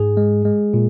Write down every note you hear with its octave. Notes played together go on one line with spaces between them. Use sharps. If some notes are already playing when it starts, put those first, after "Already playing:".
Already playing: G#2 G#4
G#3
G#3
A#2